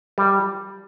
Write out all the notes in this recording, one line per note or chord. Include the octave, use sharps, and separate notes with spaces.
G3